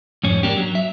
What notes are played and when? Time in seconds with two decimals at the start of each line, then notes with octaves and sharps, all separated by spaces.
0.23 F2 G#2 C#4
0.43 A#3 D4 G4
0.56 F#3
0.75 E5